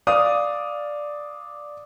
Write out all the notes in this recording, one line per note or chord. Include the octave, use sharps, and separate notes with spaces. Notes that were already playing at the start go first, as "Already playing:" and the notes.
D5 F5 D#6